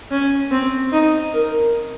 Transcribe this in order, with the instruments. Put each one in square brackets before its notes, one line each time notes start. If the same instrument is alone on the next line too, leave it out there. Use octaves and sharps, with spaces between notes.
[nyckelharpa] C#4
C4
D#4
A#4